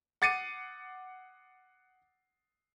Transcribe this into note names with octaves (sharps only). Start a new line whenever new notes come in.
F#5 D6 A6 C7 C#7 D#7